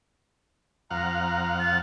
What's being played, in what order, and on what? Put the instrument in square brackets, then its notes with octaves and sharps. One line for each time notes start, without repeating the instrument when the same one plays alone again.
[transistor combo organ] F2 F5 F#5 [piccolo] A#5
[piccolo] A6